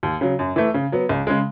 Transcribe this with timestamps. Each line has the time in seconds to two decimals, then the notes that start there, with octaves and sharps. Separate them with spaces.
0.03 D#2
0.21 C#3 F#3
0.39 F#2
0.56 E3 A3
0.74 C#3
0.92 F#3 B3
1.09 C#2
1.27 C#3 G#3